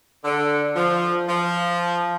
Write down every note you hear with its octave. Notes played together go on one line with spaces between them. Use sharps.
D3
F3
F3